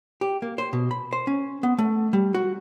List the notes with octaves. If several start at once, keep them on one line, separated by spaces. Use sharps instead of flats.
G4
A#3
C5
B2
B5
C5
C#4
B3
A3
G3
F#4